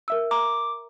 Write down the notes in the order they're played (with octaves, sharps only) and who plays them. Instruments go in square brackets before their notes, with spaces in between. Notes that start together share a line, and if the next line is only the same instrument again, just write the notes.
[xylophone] A#4 E5 E6
[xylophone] A#5 [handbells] D6